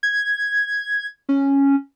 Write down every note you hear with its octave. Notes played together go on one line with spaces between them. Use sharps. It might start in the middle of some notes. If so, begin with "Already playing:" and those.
G#6
C#4